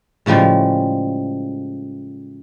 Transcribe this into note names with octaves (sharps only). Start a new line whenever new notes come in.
A2 C#3 F3 G3 G#3